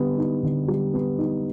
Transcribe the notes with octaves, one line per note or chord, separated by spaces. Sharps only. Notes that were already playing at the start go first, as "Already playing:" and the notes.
Already playing: D3 G3 B3
D#4
D3
G3
B3
D#4